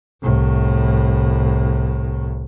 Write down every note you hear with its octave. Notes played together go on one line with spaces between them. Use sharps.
C2 A2